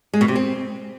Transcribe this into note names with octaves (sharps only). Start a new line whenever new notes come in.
G#3
B2
C3
C4